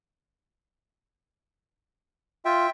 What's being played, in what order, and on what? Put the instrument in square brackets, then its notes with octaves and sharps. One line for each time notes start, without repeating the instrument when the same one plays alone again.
[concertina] F4 [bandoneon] E5 G5